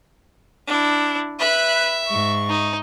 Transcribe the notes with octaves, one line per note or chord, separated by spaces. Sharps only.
D4 E4
B4 E5 B5 F#6
G#2 C#6
D#4